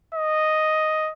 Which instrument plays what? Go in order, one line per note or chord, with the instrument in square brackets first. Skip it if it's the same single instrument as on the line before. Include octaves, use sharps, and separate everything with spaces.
[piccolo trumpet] D#5